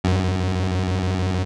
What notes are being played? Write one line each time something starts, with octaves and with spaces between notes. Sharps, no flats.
F#2